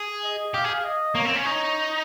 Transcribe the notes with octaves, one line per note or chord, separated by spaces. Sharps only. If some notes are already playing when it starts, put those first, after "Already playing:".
Already playing: G#4
D#5
G4 F5
G#4
D#5
A#3 C#5
C4
C#4
D#4 C#5